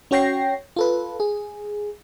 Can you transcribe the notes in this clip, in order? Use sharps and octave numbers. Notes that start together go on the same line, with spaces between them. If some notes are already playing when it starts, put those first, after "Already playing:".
C#4 F#4 C#5 G5 A#6 C7
F4 A4 B4
G#4